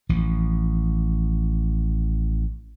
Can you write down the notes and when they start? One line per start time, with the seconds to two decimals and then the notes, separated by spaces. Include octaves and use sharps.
0.09 A1 F3